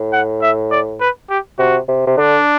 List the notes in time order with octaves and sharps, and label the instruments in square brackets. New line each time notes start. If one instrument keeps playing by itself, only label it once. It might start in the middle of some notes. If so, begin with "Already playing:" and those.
Already playing: [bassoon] A2
[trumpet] F#5
E5
D5
B4
G4
[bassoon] C3 [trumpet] F#4
[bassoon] C3
C3
[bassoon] D3 [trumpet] D4